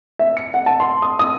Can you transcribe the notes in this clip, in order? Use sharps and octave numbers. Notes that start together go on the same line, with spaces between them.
E5
C#7
F#5
A5
C6
D#6
D#6